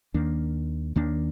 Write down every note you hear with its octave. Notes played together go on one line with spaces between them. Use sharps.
D#2 D#3 A#3 D4
D#2 D#3 A#3 D4